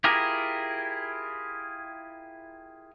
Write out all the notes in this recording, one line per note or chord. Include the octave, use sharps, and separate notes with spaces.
E4 F4 G4 G#4 A#4